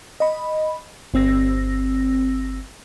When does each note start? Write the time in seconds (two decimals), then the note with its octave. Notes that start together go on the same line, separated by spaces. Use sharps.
0.20 D#5 B5
1.14 G1 C4 E6 A#6